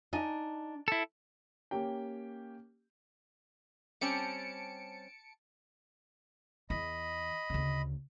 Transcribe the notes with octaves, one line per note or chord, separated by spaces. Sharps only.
D4 D#4 G#5
E4 A4
A#3 C#4 G4 G5
G3 C4 C#4 A5 C#7 D7
E2 E3 D#5 B5
D2 C#3